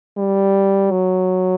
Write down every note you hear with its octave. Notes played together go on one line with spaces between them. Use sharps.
G3
F#3